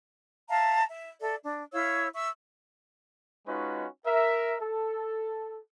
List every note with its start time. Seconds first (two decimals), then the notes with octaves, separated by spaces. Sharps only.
0.49 E5 F5 A5 A#5
0.87 E5
1.21 A4 D5 E5
1.44 D4
1.72 E4 C#5 F5 E6
2.15 E5 C#6 E6
3.47 G#3 C#4 D#4 F4 F#4 B4
4.06 A#4 E5
4.61 A4